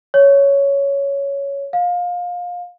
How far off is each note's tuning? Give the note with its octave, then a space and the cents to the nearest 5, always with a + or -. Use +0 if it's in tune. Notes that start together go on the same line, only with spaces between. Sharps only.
C#5 +10
F5 +25